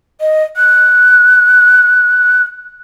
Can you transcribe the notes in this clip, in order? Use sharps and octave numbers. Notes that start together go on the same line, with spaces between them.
D#5
F#6